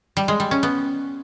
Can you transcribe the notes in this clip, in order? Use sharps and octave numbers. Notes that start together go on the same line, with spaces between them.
G3
G#3
G3
C#4
B3